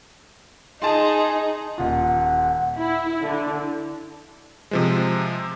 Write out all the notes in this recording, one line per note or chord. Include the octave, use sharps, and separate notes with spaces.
D#4 G#4 A5 C6
D#1 F4 F#5
E4
D3
C3 F3 G#3